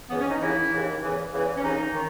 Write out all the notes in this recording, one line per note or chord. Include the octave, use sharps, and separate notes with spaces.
C#2 C#3 E3 B3
C#4
D#4
D#2 C#3 E3 E4
D#2 C#3 E3
E2 C#3 E3
E2 C#3 E3
C#4
D#2 C#3 E3 D#4
D#3